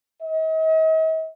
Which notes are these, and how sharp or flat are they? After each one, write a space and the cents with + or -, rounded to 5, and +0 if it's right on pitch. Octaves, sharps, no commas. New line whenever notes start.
D#5 +45